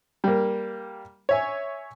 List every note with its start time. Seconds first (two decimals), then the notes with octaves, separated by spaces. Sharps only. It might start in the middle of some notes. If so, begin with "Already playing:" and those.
0.24 G3 A#3
1.29 C#5 E5 G#5